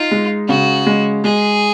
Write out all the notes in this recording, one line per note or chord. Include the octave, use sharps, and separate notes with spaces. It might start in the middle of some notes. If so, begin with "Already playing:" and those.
Already playing: D#4 F4
G#3
C#3 F#4
G#3
G#3 G#4